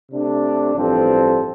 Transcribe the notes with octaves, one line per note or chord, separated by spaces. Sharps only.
C3 A3 D4
A1 G2 F3 C4 A4